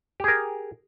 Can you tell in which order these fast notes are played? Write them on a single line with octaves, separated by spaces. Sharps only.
G4 G#4 A#4